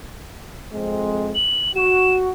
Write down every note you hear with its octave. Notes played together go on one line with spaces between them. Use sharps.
F2 G#3 C4
F#7
F#4 E7